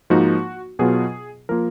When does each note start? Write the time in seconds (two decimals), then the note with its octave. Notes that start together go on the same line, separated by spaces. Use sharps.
0.10 G#2 F3 A#3 D#4 F#4
0.79 B2 F#3 B3 F4 G#4
1.49 F3 A#3 F4 A#4